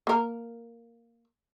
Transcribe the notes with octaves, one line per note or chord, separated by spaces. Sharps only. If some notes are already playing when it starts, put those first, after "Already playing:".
A#3 A#4